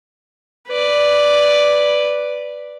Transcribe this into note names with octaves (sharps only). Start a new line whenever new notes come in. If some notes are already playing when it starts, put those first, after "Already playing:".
B4 D5